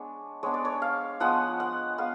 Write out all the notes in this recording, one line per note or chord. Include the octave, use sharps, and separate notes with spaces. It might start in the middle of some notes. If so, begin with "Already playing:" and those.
Already playing: G#3 B3 D4 C#5
G#3 B3 D4 C#5
D5
C#5
F5
F3 G#3 B3 F#5
F#5
G#3 B3 F5